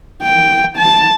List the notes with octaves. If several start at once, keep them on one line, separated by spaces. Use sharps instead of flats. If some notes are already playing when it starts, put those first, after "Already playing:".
G5
A5